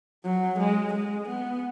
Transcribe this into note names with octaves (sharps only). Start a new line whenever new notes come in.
F#3
G#3
G#3
B3